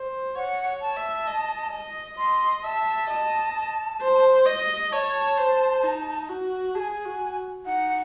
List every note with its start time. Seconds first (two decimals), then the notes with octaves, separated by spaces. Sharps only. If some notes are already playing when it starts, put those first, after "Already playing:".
Already playing: C5
0.35 C#5 F#5
0.66 C#5
0.81 A5
0.97 E5
1.27 D#5
1.73 D#5
2.18 D#5 C6
2.63 E5 A5
3.10 D#5
4.01 C5
4.46 D#5
4.92 C#5 A5
5.38 C5
5.84 D#4
6.29 F#4
6.74 G#4 G#5 A5
7.05 F#4
7.66 D#4 F#5